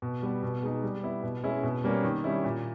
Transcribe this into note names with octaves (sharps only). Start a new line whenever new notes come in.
B2
G3 B3
B2
G#3 D#4
G3
B3 E4
B2
G#3 C#4 E4
B2
G3 A#3 C#4
D#3
G3 C#4 E4
A#2